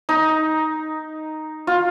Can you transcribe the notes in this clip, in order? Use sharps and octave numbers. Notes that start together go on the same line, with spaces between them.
D#4
F4